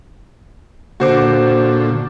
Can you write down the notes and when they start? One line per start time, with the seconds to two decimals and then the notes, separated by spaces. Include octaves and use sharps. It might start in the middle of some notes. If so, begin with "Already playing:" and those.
1.00 A#2 D3 F#4 C5 D6